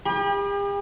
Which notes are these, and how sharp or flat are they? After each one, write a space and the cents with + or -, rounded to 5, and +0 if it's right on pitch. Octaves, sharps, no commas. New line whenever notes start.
G4 +45 G5 +40 B5 -30